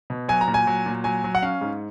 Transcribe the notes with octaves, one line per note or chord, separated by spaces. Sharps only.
B2
F#3 G#5
A#5
A#2
G#5
F#3
A#2
F#3 G#5
F#3
F#5
C#4 F5
G#2